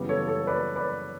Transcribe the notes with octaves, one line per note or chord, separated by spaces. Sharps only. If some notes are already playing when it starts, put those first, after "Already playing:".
Already playing: F#2 C#3 E3 G3 B3
A4 C#5
A4 C#5
B4 D5
B4 D5